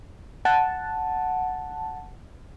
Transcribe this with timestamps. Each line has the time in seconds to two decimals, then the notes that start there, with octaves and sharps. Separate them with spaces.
0.45 F#5 A5